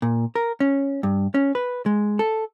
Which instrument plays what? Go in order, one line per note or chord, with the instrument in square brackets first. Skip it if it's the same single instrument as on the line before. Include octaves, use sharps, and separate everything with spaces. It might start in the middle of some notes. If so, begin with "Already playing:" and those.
[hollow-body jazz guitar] A#2
A#4
C#4
G2
C#4
B4
G#3
A4